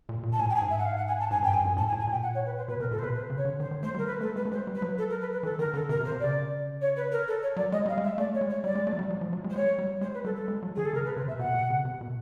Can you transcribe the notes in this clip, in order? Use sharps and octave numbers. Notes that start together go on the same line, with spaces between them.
A#2
A#2
A5
A2 G#5
G5
G#5
G#2
E5
F#5
F5
F#5
G#5
A5
G#2 G#5
G2 G5
G2 G#5
F#2
A2 A5
G#5
A2
G#5
A#2 G5
F#5
C#5
B4
C5
B2 B4
C3 A#4
A#2 A4
C5
C3 B4
C5
C#3
C#5
D3
D#3 C5
D#3
A3 C5
G3 A#4
B4
A3 A4
G#3 B4
A3
G#3 C5
G3
B4
F#3
A4
A#4
B4
B4
E3 A4
D#3 A#4
D3 A4
C3 A#4
C3
C5
C3
C#3 D5
C#5
B4
A#4
A4
C#5
F#3 D5
G#3 D#5
G3 F5
G#3
E5
A3 D5
C#5
G#3
C#5
G3 D5
G#3
A3
F#3
G3
F#3
F3
F#3
G#3
C5
G#3 C#5
G3
G#3 C5
B4
G3 A4
A4
G#3
F#3
D#3 G#4
A4
C#3 A#4
B4
C#3 C5
C3 E5
B2 F#5
B2
C#3
C3
B2